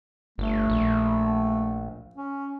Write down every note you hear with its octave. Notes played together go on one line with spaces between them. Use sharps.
G1 A3
A#1
C#4